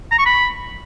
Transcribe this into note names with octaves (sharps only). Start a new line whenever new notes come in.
A#5
C#6
B5